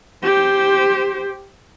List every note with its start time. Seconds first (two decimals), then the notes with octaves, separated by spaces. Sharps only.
0.23 G4 C5